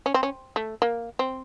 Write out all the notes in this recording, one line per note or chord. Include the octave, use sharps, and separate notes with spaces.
C#4
C4
C#4
A3
A#3
C4